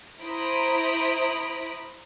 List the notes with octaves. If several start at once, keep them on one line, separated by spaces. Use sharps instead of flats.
E4 C5 A#5 B5 D#6 D7